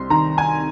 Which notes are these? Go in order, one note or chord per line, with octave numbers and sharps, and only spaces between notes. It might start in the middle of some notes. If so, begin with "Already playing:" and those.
Already playing: C2 C3 C6
D#3 A#5
G#5